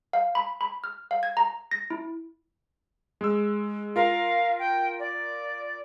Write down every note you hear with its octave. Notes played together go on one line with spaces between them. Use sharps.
F5
B5
B5
F6
F5
G#6
A#5
A#6
E4
G#3 E6
F4 A#4 F5
G5
D5